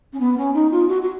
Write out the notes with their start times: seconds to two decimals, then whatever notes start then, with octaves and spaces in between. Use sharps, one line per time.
0.13 C#4
0.19 B3
0.37 C#4
0.53 D#4
0.71 F4
0.88 F#4
1.02 F#4